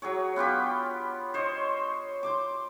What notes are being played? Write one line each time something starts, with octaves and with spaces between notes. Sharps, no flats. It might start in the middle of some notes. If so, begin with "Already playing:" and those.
F#3 G#4 C#5
B3 F4 G4 B5
C5 C#5 D#5
C5 C6 D6